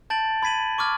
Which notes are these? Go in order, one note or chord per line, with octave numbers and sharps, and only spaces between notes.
A5 G6 A6 D7 F#7
B5 G#6 B6 D#7 F#7
C#6 D6 F6 G#6